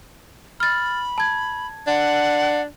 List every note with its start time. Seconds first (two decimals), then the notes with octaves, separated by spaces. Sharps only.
0.60 B5 F6 A6
1.18 A5 G#6
1.87 D4 F#5